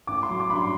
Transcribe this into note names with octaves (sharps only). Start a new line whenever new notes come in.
A1 D6
C6
F#3
D6
G2 B5
C6